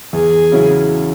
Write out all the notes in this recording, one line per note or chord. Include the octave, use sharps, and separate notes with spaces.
E2 G#4
C#3 F#3 C#4 E4